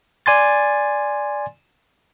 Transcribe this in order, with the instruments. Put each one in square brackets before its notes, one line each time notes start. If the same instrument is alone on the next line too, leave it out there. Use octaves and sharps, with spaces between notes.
[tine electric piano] D5 G#5 C6 A6